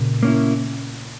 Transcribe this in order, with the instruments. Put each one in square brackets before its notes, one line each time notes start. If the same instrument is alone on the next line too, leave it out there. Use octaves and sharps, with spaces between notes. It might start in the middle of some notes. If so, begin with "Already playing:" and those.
Already playing: [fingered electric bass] A#2 C#3
[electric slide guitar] A#3 C#4 E4